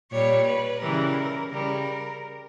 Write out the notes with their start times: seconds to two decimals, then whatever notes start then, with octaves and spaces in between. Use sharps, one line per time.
0.12 A#2 G3 C#5
0.47 B4
0.81 C#3 E3 G3 A#4
1.51 C#3 G3 A#4